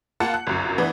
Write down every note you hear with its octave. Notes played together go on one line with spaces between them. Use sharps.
A#3 F4 F#5 A5 C#7
F#6
G1 C2 F#2
E3 B3 D4 E4